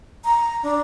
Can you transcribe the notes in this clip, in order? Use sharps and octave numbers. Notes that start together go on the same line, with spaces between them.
A#5
D4